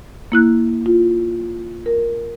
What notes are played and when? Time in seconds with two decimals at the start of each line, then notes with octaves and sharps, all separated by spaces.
0.32 A#3 E4 F#6
0.86 F4
1.86 A#4